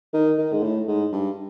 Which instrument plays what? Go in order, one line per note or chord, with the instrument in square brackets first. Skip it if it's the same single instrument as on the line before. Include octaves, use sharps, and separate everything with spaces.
[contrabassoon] D#3
D#3
G#2
A2
G#2
G2